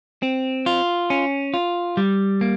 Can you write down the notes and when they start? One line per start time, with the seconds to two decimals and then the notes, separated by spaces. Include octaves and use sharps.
0.23 C4
0.66 F4
1.10 C#4
1.54 F4
1.97 G3
2.41 A#3